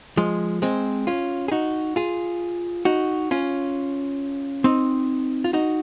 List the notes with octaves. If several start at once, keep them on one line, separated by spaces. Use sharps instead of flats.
F3 G#3
G#3 C4
C#4 F4
G#4
D#4 F#4
F4 G#4
D#4 F#4
C#4 F4
C4 D#4
F4
D#4 F#4